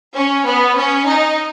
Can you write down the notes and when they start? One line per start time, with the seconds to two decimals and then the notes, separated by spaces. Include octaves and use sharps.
0.16 C#4
0.46 B3
0.77 C#4
1.07 D#4